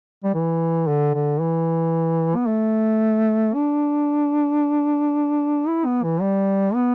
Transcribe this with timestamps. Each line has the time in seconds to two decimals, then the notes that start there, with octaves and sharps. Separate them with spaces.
0.24 G3
0.34 E3
0.88 D3
1.14 D3
1.41 E3
2.36 B3
2.48 A3
3.54 D4
5.68 E4
5.86 B3
6.04 E3
6.21 G3
6.74 B3